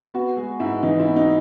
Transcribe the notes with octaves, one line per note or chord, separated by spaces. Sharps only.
B3 F#4
G#3 G#4
G#2 E4
E3 D#4
E4
B3
D#4